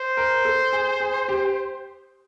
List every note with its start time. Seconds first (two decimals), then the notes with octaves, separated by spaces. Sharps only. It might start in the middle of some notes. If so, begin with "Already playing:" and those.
Already playing: C5
0.17 A#4
0.45 A4
0.73 G#4
1.00 G#4
1.29 G4